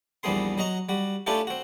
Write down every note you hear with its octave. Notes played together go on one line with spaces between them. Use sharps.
A#1 E2 G3 B3 G#4 C6
F#3 F#4 D#5 A#5
G3 F#4
A3 C#4 D4 E4 F4 G4
C4 F#4